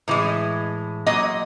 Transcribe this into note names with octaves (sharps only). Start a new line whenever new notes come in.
A2 E3 G#3
A#2 F#3 D#5